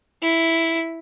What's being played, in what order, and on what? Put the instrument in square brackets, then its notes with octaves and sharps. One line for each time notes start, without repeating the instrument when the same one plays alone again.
[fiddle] E4